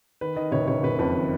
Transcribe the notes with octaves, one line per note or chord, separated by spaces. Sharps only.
D#3 B4
D#3 D#5
F#1 C#5
F#1 C#5
F#1 B4
F2 B4
D#3